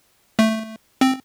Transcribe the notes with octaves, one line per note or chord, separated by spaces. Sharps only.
A3
C4